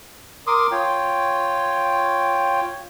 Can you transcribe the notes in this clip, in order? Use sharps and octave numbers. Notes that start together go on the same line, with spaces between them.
A#4 C6 D6 D#6
F4 C#5 G5